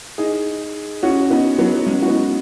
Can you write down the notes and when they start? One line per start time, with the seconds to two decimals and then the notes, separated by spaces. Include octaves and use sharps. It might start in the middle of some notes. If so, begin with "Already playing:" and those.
0.18 D#4 G#4
1.03 C#4 F#4
1.30 B3 D#4
1.58 F#3 B3
1.86 G#3 C#4
2.02 F#4
2.07 B3 D#4